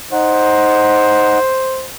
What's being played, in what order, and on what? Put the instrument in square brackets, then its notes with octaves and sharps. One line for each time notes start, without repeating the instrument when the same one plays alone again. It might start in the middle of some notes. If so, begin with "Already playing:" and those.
[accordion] D#4 F#5 [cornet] C5